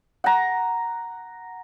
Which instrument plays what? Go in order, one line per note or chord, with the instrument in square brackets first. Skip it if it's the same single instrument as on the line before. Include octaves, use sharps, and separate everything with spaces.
[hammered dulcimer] F#5 A#5